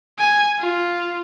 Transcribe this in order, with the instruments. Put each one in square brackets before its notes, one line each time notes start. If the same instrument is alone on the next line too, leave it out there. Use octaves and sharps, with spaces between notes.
[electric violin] G#5
F4